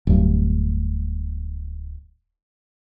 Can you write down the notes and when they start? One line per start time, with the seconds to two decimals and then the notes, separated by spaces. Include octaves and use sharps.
0.07 D1 G2